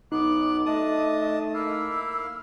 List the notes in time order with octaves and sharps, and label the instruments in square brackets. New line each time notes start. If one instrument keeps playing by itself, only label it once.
[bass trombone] B1 [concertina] B3 F#6 [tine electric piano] D#4 [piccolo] D6
[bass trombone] A3 [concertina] D4 A5 D#6 [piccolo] D#5
[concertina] A#3 E4 F5 [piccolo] E6